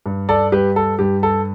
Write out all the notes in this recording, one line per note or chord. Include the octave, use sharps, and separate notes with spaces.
G2
A4 D5
G3 G4 B4
A4
G2 G4
A4